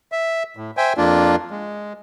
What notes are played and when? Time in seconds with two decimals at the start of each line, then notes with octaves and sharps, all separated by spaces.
0.12 E5
0.57 A2
0.77 C5 E5 G5 G#5
0.97 F2 A#3 D4 F4
1.51 G#3